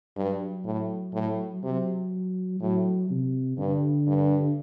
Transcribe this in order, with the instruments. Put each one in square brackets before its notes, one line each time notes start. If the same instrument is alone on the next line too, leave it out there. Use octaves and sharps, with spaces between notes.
[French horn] G2 [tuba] F#3
[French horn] A2
A2
[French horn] C3 [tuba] F#3
[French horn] A2 [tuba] F#3
[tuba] C3
[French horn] G2 [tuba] D3
[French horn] G2